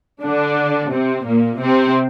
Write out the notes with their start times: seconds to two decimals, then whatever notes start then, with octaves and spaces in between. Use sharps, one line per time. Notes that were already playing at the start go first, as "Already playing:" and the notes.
0.22 D3 D4
0.91 C3 C4
1.25 A#2 A#3
1.60 C3 C4